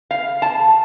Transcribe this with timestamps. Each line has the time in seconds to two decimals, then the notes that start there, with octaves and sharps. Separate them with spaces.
0.11 F5
0.42 A5